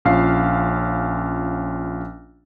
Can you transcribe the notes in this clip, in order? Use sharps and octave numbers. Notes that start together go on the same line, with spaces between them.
A#1 C#4 F4 F5 C7